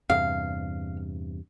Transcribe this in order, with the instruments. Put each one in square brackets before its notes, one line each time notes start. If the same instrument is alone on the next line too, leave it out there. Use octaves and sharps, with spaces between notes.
[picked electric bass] E2 G2 C3 [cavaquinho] F5